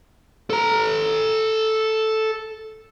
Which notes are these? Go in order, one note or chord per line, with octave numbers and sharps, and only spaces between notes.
A4 A#5